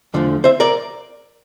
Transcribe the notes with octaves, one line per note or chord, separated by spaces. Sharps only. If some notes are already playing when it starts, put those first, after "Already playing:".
E2 D3 F3 A3
C5 E5
A#4 D5